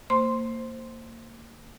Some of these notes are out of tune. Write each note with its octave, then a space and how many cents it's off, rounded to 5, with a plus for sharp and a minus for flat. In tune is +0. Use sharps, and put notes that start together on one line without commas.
A#3 -30 C5 +5 C6 +0